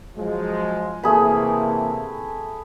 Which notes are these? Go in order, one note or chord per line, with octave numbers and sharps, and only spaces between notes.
F3 F#3 G#3
C3 E3 A3 A#3 G#4 B5